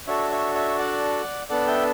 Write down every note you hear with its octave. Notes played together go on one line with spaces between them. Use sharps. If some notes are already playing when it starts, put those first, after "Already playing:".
D4 F#4 A4 C#5 E5
C#5 E5
C#5 E5
D5 F#5
B3 D4 A4 D5 F#5
E5 G5